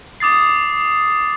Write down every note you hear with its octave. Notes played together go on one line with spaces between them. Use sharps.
D6 D#6 A6 C7